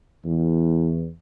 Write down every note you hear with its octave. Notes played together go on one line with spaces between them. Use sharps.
E2